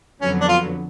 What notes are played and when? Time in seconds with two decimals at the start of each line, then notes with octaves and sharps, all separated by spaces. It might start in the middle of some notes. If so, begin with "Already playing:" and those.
0.21 F2 D3 F#3 B3 C#4
0.41 D4
0.48 F4